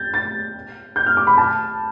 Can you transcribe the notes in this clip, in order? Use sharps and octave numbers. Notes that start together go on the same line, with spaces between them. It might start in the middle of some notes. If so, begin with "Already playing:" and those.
Already playing: G6 A6
A6
G6
F6
D6
B5
A5